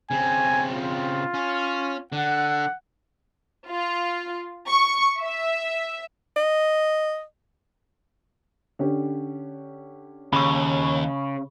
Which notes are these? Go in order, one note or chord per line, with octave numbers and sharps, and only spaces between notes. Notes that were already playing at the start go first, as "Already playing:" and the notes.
C#3 C4 G#5
F4
C#4
D3 F#5
F4
C#6
E5
D#5
D3 C#4 G4
D#2 C#3 B5 C#6